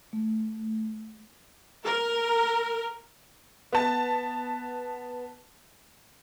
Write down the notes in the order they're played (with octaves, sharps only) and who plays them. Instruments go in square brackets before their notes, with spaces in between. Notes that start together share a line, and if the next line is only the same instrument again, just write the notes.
[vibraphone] A3
[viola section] A#4
[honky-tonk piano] B3 A5